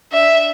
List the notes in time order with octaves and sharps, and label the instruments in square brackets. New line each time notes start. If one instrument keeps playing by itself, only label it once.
[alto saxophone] D4 [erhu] E5